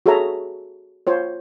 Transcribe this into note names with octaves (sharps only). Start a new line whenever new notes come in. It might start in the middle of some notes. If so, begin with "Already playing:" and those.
F#4 G#4 A4 C#5 E5 A#5
F4 C5 C#5